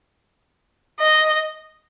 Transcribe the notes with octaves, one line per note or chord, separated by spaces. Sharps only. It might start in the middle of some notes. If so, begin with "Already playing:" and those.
D#5